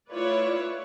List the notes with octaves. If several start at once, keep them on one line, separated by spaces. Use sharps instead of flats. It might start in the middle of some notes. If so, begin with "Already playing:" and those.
A3 E4 F4 B4 C#5 D5